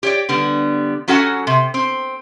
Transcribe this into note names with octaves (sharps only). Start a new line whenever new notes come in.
G4 C#5 D5
D3 G3 B3
F#3 C#4 F#4 A4 F#5 G#5
C3
C4